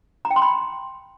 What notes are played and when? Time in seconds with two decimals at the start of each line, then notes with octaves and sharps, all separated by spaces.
0.25 A#5
0.31 G5
0.36 C6
0.42 B5